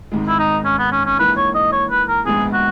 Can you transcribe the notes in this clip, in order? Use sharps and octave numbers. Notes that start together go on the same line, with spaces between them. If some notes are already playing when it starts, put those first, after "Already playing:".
G#1 G#2 D#3 G#3
E4
D#4
C#4
B3
C#4
C#4
A#1 G#2 E3 A#3 B4
C#5
D#5
C#5
B4
A#4
A#1 G#2 D#3 G#3 B3 G#4
F#4